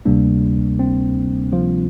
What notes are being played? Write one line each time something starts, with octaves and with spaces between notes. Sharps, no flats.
D2 C3 G3 A#3 D4
C4
F3 F4